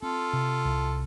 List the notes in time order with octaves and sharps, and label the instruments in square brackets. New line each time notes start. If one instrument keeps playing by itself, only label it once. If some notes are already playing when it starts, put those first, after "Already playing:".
[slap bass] C4 [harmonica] F4 A4
[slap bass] C3
C2